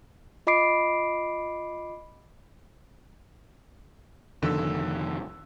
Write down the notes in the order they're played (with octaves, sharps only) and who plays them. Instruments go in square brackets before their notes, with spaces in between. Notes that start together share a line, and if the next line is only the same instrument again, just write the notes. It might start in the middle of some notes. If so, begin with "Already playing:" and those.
[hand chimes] F4 D#5 B5 D6 C7 D7
[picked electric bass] F1 F2 D#3 [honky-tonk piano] D3 E6